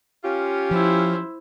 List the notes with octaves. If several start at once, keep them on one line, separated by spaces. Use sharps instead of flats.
C#4 F4 G4
F3 E4 C5